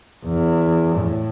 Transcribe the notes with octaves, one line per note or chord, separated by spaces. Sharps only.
E2
A2